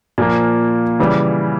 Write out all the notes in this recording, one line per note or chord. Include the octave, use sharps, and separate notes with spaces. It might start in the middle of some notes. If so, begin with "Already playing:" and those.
A#2 F3 A#3
C#3 E3 G3